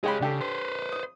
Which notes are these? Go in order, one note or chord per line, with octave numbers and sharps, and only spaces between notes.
G#3 G4 G#4 C#5 B5
C#3 D4 G4 A4
B4 C5
D#6